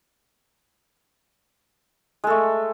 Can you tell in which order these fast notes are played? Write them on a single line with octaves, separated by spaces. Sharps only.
G#3 A4 A3